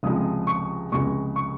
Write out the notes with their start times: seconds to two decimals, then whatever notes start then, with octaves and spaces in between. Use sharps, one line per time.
0.03 C#2 C3 F3 G#3 D#6
0.47 C#6
0.92 C#2 C3 F3 G#3 C#6
1.36 C#6